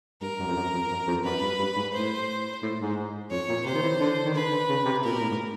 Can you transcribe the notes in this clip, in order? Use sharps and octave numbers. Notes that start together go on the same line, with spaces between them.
G2 A#4
F#2
F2
F#2
F2
F#2
F2
F#2 B4
G2
G2
G#2
A2 C5
A2
G#2
F2 C#5
A#2
C3 C5
D#3
E3
D3
D#3
D3 B4
D3
C#3
C3
A#2 A#4
B2
A2
G#2